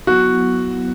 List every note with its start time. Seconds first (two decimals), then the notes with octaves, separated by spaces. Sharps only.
0.07 F#3 B3 E4 F#4